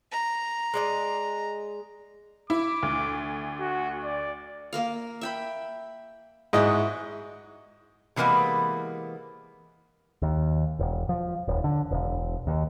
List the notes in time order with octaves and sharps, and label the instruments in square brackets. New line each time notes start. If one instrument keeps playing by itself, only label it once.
[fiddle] A#5
[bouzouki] G#3 D5 D#5
[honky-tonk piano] E4 [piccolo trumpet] D6
[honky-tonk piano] D2
[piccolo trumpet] F#4
D5
[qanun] A#3 A#4 F5
E5 G5 B5
[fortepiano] G#2 D#5 [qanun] E4 F#4 B4
[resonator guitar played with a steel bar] C3 E3 G#3 A#3 B3
[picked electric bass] D#2
E1
F3
D#1
D3
E1
D#2